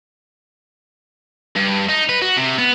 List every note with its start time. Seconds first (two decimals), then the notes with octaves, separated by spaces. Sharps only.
1.56 G2
1.89 D#4
2.09 B4
2.22 F#4
2.37 C3
2.58 B3